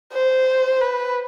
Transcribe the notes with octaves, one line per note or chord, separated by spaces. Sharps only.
C5
B4